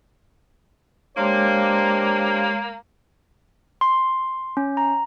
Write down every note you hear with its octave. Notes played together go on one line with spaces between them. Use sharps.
G#3 A#3 D4 G4 C5 C#5 C6
C6
C#4
A#5